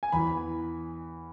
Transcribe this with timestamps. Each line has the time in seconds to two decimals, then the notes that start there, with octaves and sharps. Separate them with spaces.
0.03 G#5
0.12 E2 E3 B5